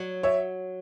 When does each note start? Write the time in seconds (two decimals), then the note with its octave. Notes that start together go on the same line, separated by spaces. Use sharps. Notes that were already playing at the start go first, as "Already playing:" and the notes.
Already playing: F#3
0.23 C#5 E5